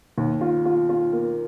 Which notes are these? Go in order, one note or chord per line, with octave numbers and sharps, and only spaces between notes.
D#2
F4
F4
F4
A#3